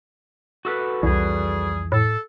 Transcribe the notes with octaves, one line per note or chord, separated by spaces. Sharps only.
F#4 A4 B4
C2 F2 E3 G3 G#4
A2 A4